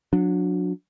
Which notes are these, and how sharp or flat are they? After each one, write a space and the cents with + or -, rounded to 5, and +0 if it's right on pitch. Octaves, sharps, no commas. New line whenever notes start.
F#3 -30 D4 +0